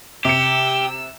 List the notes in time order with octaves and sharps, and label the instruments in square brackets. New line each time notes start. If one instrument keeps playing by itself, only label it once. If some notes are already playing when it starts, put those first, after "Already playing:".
[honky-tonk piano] C3 C#7 [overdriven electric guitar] G4 [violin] E6